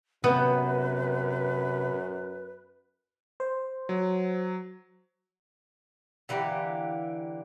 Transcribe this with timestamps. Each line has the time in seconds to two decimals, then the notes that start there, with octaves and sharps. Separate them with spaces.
0.24 F#2 C3 B3 B4
3.40 C5
3.89 F#3
6.29 D3 E3 A#3 G4